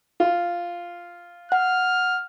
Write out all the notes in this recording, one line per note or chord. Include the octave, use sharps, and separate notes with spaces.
F4
F#5 F6